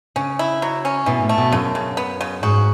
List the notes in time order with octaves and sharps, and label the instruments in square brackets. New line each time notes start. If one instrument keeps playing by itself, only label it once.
[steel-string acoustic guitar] C#3 [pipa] C#4
[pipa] E4
F#3
C#4
[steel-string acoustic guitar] B2 [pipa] E3
[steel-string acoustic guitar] A2
[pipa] A3
[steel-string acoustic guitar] B2
[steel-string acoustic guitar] F#2 [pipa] C#3
[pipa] C#3
B3
C#3
[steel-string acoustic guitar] G#2 [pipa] F#4